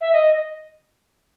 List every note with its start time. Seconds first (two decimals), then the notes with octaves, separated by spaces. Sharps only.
0.01 E5
0.13 D#5